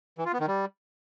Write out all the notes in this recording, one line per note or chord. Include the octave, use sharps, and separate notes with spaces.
E3
F4
B3
D#3
G3